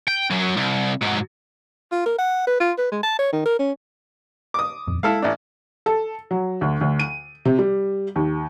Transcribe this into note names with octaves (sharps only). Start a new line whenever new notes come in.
G5
F#2 F#3
C2
G#2 F#3
F4
A#4
F#5
B4
F4
B4
G#3
A5
C#5
D#3
A#4
C#4
D6 D#6
D#1 F2
G#3 E4 A4 F5
A1 D4
A4
F#3
D2
D2
D#7
C3
G3
D#2